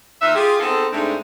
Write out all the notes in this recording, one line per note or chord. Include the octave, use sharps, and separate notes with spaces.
D#2 D#4 F4 B4 E5
F4 G4 G#4
B3 C4 D#4 G#4 A4
G2 G#3 A3 C4 D4 D#4